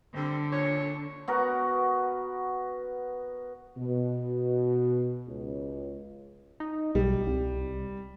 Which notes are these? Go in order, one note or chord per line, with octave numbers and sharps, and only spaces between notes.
D3 G3 C4
A#2 C#5
B3 F#4 A#4
B2
C#2
D#4
B1 G3
C2